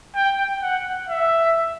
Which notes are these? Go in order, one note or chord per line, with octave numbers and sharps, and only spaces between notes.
G5
F#5
E5